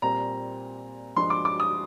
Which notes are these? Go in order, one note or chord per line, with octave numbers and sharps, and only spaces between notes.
A#2 G3 C4 A#5
G2 F3 G#3 C6
D6
D6
D#6